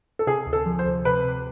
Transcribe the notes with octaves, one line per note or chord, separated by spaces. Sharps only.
A4
C3 G#4
D2
A4
F3
C5
D2
C3 B4
C3